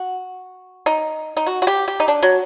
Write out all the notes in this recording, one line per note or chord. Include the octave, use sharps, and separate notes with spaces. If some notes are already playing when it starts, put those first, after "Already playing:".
Already playing: F#4
D#4
D#4
F#4
F#4
G4
G4
D#4
D4
F#3